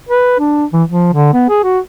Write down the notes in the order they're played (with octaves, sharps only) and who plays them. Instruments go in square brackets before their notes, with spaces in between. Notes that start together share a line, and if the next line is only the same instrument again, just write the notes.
[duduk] B4
D4
E3
F3
D3
B3
G#4
F#4